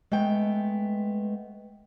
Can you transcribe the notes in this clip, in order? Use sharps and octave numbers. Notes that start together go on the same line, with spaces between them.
G#3 A3 B3 G5